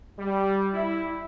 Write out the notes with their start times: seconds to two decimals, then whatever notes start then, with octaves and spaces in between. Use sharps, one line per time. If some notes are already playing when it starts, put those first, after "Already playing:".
0.17 G3
0.73 E4